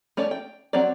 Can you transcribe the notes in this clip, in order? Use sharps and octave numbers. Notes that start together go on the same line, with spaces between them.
A3 C#4 C#5 D5
G5
F#3 C4 C#5 D5